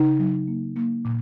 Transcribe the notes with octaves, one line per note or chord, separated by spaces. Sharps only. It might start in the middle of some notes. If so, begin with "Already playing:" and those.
Already playing: C#3 D#4
F#3
A#3
A#3
A#2